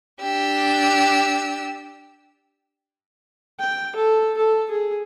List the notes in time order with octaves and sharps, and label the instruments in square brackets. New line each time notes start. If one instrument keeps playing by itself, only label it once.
[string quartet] D4 G4 E6
[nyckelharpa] G5
A4
A4
G#4